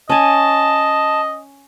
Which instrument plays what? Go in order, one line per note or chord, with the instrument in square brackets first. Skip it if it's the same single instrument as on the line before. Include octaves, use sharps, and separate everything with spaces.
[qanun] C#4 G#5 [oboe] D#5 [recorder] A5